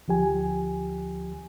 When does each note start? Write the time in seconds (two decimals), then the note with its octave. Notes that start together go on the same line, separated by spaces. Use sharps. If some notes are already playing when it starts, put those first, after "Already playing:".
0.08 D2 F3 G4 G#5